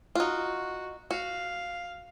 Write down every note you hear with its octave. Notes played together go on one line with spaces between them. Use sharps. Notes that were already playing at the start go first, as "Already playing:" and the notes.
D#4 F4 F#4
F#4 F5